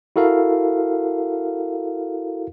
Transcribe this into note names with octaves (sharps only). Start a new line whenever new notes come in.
E4 F#4 A4 A#4 F5